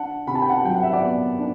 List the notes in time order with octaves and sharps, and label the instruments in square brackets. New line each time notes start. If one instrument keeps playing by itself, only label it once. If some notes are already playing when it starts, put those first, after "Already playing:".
Already playing: [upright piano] D4 F#5 A5
C3 B5
A5
G5
F#5 A5
F#3 G5
F#5
E5
D5 F#5
B3
D4